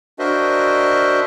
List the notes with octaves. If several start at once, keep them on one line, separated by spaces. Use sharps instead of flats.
D4 F#4 A#4 C5 D#5 E5